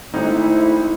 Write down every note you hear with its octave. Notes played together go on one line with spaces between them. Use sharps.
G#1 A3 D#4 E4